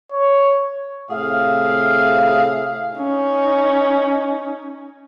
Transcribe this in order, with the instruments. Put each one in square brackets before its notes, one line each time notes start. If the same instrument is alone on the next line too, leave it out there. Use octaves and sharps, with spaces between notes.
[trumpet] C#5
[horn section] A2 C3 G#4 E5 F5
[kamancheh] C#4 D#4